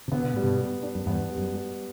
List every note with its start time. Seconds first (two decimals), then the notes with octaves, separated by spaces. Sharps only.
0.08 C3
0.12 B2 D3 B3
0.34 A2 G3
0.43 G2 B2
0.60 G3
0.83 D4
0.95 F#2
1.06 E2 G2 B3
1.30 G3
1.37 F#2
1.54 G3